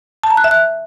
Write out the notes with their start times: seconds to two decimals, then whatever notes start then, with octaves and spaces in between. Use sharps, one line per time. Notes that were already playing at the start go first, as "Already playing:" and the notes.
0.24 A5
0.30 A#5
0.37 F#6
0.44 E5
0.51 F#6